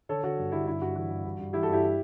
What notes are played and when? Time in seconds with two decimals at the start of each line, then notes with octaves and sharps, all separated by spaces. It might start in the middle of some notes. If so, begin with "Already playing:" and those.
0.09 D3 A4 C#5
0.23 D3 F#4 A4
0.38 G2
0.52 D3 E4 G4
0.67 G2 E4
0.82 G2 F#4
0.96 E3 F#4
1.10 G2
1.24 G2
1.39 G2
1.53 E3 E4 G4
1.63 F#4 A4
1.68 G2
1.73 E4 G4